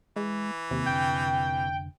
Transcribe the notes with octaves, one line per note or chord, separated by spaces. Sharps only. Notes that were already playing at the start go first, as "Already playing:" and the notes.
E3 G#3
D#2 C3 D#3 A#3
F1 D3 G5